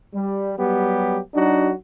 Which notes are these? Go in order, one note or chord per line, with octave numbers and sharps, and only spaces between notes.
G3
F#3 G3 B3 G4
F#3 D4 D#4 F#4